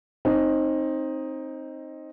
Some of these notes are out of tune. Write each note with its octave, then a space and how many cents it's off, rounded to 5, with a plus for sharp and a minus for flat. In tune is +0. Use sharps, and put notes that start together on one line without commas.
C4 +25 D#4 +0